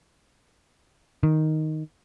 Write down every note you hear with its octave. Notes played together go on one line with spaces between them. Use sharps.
D#3